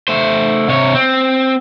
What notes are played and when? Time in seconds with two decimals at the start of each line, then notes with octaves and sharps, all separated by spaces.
0.08 A3 C5
0.68 C3 C#5
0.95 C4